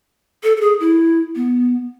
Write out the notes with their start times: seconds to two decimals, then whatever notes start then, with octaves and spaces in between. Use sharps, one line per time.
0.43 A4
0.57 A4
0.61 G#4
0.80 E4
1.35 B3